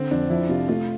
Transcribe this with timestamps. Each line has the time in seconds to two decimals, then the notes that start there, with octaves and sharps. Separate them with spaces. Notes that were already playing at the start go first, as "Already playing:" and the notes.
Already playing: D3 C4
0.11 F2 D4
0.30 F3 E4
0.49 C3 F4
0.69 A3 F4